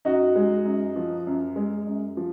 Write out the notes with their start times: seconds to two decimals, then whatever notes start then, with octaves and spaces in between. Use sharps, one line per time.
0.05 F#2 D#4 F#4
0.35 G#3
0.65 F#2
0.96 F3
1.27 F#2
1.56 G#3
1.87 F#2
2.17 F3